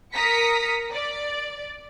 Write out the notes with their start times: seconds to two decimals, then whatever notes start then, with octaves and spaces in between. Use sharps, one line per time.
0.12 A#4 A#5 D#6 B6 C#7
0.92 D5